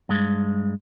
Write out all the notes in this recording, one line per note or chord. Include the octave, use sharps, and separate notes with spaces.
G2 G#3